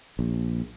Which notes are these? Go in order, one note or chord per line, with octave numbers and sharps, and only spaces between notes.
A#1